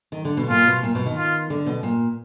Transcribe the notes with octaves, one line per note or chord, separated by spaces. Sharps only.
D#3
D3
B2
A#2 F4
B2
A#2
B2
D#3
F4
D3
B2
A#2